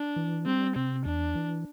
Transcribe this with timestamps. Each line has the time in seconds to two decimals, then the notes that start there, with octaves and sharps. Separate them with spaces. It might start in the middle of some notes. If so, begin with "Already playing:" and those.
Already playing: D4
0.16 E3
0.46 G3 C4
0.75 C3 C4
1.05 E2 D4
1.35 E3